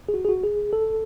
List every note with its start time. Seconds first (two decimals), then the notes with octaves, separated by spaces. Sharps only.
0.09 G#4
0.14 F#4
0.25 G#4
0.29 F#4
0.43 G#4
0.73 A4